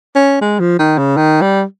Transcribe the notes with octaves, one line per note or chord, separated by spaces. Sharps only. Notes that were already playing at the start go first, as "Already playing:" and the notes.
C#4
G#3
F3
D#3
C#3
D#3
G3